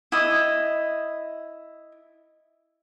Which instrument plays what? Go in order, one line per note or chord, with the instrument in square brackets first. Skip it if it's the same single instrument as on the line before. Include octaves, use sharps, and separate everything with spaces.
[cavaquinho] E4 D#5